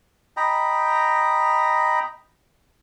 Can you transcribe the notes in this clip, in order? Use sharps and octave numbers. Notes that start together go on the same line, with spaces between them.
D#5 G5 A#5 B5